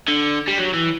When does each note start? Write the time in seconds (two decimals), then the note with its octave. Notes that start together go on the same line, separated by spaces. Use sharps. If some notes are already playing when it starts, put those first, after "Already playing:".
0.08 D3
0.48 G3
0.58 F#3
0.74 E3